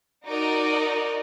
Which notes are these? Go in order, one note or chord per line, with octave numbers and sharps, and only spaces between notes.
D#4 F#4 A#4 D5 D#5